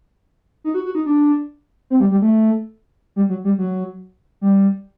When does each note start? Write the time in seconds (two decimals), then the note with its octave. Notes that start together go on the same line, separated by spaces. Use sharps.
0.64 D#4
0.74 F#4
0.85 F#4
0.95 D#4
1.06 D4
1.90 C4
2.00 G3
2.11 G3
2.22 A3
3.16 G3
3.29 F#3
3.44 G3
3.58 F#3
4.41 G3